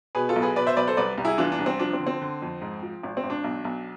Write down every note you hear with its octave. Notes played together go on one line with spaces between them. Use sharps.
B2 G#4 B4
F4 A4
B1
G#4 B4
B2 B4 D5
C5 E5
B1 B4 D5
A4 C5
C2 B4 D5
C2
E4 G#4
E3 D4 F4
D4
C2
C4
F3 D4
C4
D3
C4
D3
F2
G#2
F3
G#1
C4
G#1
D4
B1
B1